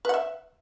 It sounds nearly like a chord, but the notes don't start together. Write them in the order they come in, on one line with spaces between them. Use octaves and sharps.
B4 F#5 E5